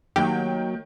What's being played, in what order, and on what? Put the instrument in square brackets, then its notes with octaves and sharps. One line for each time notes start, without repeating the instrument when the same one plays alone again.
[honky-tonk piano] D#3 G5 [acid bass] F#3 [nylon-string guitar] A#3 [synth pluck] G4